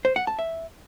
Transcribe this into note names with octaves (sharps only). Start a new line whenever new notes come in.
C5
F#5
A5
E5